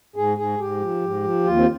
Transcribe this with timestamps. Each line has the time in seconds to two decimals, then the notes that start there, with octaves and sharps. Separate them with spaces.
0.16 G#2 G#4
0.37 G#2 G#4
0.59 G#2 G4
0.81 F3
1.02 G#2
1.23 F3
1.44 D#2 F4
1.57 C4